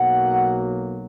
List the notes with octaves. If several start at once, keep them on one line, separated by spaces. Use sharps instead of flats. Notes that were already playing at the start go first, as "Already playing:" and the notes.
Already playing: B1 B2 F#3 A#3 F#5